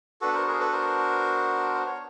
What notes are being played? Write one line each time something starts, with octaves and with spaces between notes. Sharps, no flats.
B3 D4 F#4 A4 B4
A#4 C5
G#4 A#4
C5
A4 B4
A#4 C5
C5
C#5